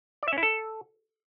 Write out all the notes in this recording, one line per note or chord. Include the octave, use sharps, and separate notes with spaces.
D5
E5
C#4
E4
A4